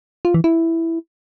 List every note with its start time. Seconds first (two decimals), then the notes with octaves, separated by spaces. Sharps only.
0.25 F4
0.34 E3
0.44 E4